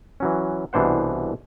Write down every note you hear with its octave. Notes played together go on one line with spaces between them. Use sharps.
E3 F#3 C#4
C2 B2 E3 D4 C5 F#5